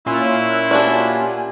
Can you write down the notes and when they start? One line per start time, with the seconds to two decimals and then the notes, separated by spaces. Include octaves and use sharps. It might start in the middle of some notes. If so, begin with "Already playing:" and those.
0.06 A#2 C#4 E4 F4 C#6 E6 F#6
0.71 D4 F#4 G4 A#4 D5 G#5